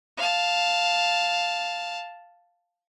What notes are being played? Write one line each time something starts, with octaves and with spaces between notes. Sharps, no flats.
F5 A5